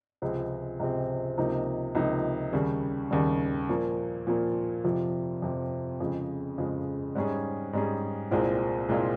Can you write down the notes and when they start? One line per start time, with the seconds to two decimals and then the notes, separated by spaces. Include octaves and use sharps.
0.22 C#2 C3 F3 G#3 C4
0.80 C#2 C3 F3 G#3 C4
1.37 C#2 C3 F3 A#3 D#4
1.95 C#2 C3 F3 A#3 D#4
2.53 D#2 C#3 G3
3.11 D#2 C#3 G3
3.69 A#2 F3 A#3
4.27 A#2 F3 A#3
4.84 F2 C3 F3
5.42 F2 C3 F3
6.00 F2 C#3 F3 G#3
6.58 F2 C#3 F3 G#3
7.15 G#2 G3 C#4 G#4
7.73 G#2 G3 C#4 G#4
8.31 C2 A#2 G#3 C4 F4
8.89 C2 A#2 G#3 C4 F4